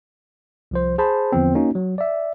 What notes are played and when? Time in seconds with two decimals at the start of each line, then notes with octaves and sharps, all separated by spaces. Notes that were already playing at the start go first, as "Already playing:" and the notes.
0.71 C2 F3 C5
0.98 G#4 C5 A5 B5
1.32 E2 D3 F3 B3 C4
1.55 A#3 C#4 D#4 F#4
1.75 F#3
1.98 D5 E5